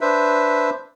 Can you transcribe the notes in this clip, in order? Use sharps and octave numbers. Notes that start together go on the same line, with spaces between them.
D4 B4 C5 E5